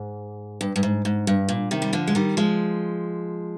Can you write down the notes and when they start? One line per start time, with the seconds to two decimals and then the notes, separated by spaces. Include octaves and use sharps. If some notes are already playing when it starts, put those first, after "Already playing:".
Already playing: G#2
0.61 G2
0.76 G2
0.83 G#2
1.05 G#2
1.27 G2
1.49 A#2
1.71 C3 D#3
1.82 G3
1.93 D3 F3
2.08 G#3
2.15 D#3 G3
2.37 F3 G#3